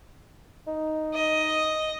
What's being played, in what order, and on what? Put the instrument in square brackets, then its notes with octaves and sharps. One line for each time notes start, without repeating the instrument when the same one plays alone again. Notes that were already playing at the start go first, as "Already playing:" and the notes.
[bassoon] D#4
[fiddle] D#5